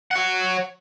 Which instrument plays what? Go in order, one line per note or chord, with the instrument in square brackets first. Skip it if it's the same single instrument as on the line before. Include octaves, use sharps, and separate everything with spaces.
[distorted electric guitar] C#5 F#5